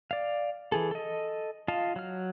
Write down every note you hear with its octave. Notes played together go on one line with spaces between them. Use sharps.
D5 F5
E3 G#4 A4
A4 D#5
F4 D#5 F5 A5
F#3 F6